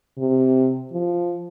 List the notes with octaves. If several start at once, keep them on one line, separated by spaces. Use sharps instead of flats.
C3
F3